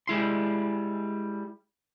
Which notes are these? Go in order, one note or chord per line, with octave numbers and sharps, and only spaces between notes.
G3 G#3 E4 C6